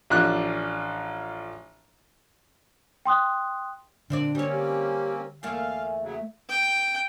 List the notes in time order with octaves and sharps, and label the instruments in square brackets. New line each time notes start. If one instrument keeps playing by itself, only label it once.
[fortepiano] A1 F3 D4 F#6
[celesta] G5 C6 D#6 F#6
[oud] A#2 C4 D5 [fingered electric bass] D3 [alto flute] D4
[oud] G3 C#5 [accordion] A#3 C4 C#4
[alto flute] G4
[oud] E2 A3 A#3 [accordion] F5 [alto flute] G#5
[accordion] C#3 F#3 [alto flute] E5
[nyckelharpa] G5